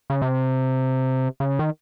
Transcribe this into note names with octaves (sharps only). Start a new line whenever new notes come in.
C#3
C3
C#3
D#3